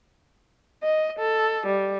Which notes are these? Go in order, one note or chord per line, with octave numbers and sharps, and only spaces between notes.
D#5
A4
G3